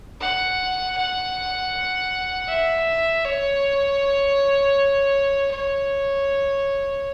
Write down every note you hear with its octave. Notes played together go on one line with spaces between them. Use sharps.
F#5
F#5
E5
C#5
C#5